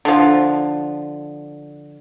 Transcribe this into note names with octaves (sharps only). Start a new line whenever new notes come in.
D3 F3